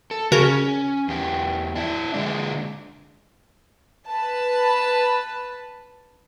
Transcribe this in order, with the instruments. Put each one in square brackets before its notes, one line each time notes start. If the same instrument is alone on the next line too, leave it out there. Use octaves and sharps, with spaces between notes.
[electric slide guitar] A4
[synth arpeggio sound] C#3 F#4 A#4 [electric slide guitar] C#4
[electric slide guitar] E2 G4
D4 E4
D3 G#3 D4
[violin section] B4 A5